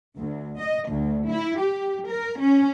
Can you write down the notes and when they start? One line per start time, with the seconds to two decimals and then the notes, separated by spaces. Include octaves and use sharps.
0.17 D2
0.59 D#5
0.89 D2
1.28 E4
1.59 G4
2.07 A#4
2.41 C#4